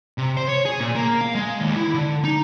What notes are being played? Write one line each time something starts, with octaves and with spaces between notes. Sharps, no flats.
C3
C5
C#5
G#4
A#2
A#3
F5
G#3
D#2
E4
D3
D#4